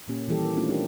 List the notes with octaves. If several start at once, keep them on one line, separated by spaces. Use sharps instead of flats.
A#2 A#3 C#4 G4
D#3 E3 G3 G4 A4
A#4
A3 C4 C#4 D#4 F4
D4 G4 A#4